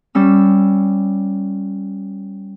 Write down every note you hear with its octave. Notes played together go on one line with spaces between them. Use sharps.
G3 C#4 E6